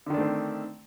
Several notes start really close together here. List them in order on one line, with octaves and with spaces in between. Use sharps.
D3 D#3 D4 A3 C4